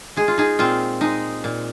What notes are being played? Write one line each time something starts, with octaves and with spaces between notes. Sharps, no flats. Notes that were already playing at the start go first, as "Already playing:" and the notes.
G#3 G#4
F4
D#4 G#4
A#2 C4 F4
G#3 D#4
A#2